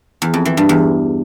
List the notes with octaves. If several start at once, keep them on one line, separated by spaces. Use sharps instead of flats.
E2
F2
E3
G2
E2